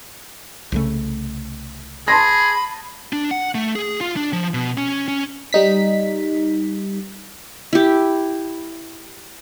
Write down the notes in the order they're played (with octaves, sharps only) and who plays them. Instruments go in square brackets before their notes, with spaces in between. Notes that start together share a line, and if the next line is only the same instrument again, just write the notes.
[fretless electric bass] C2 C#3 A3
[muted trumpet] G#4 [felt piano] A5 C6 A#6 [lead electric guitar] B5
[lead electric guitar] D4
F#5
A3
G#4
F4
D4
F3
B2
C#4
C#4
[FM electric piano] G3 D#4 B6
[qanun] E4 G4